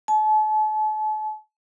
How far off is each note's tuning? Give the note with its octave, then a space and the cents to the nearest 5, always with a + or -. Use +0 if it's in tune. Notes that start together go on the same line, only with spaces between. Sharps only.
A5 -40